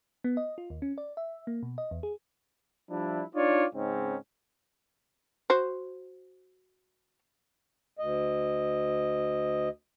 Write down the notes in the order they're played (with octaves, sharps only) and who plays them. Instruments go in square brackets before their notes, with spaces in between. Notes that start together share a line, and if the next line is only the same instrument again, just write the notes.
[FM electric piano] B3
D#5
F4
D#2
C#4
D5
E5
A#3
B2
D#5
E2
G#4
[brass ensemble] F3 G3 D4 E4
D4 D#4 F4 C#5 D5
G#2 C#3 C4 C#4 D#4
[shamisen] F#4 C5
[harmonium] D2 D#5